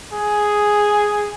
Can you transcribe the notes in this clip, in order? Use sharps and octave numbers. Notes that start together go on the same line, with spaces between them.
G#4